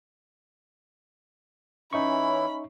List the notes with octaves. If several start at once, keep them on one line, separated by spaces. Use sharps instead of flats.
E3 C#4 D#4 E4 E5 B5 C#6